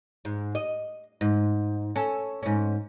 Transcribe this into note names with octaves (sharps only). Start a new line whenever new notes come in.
G#2
D#5
G#2
C#4 A4
G#2 C#4